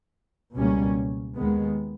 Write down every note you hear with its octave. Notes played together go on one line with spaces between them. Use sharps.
C#2 B2 G3 A#3 C#4
D#2 D#3 G#3 B3